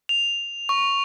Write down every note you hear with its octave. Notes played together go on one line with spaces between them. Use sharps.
F7
C#6